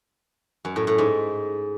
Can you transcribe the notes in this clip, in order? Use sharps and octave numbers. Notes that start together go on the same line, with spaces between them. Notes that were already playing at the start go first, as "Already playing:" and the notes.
F#2
A2
A2
G#2